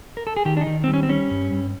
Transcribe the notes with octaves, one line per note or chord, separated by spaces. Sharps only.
A#4
A4
G#4
D#3 G4
D4
D#4
D#3
G3 C4
C#4
C4
G3 C#4
G2
G2